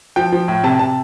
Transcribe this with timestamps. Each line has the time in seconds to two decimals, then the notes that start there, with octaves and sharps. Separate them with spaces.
0.16 F3 G5
0.32 F3
0.48 A2
0.63 C3 A5
0.79 C3 A5